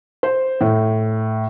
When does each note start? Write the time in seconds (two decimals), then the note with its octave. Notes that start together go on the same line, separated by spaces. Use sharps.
0.23 C5
0.61 A2